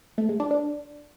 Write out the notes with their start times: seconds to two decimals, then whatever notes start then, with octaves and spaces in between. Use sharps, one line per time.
0.18 A3
0.29 G#3
0.40 D4
0.51 D4